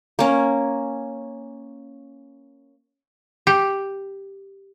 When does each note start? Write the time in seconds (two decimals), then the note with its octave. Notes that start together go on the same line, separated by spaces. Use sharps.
0.19 A#3 C#4
3.47 G4